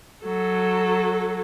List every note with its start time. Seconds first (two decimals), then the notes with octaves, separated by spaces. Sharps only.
0.25 F#3 A4